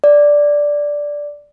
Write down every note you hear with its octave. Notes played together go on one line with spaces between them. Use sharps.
D5